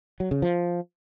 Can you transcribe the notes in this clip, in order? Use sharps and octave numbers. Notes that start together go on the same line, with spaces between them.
F#3
C#3
F3